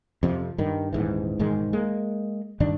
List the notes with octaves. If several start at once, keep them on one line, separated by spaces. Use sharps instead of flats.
F2 C3 F3
G2 D#3
D#1 G#2 E3
E1 G#2 D#3 G#3
G#3 A#3
G2 D#3 D4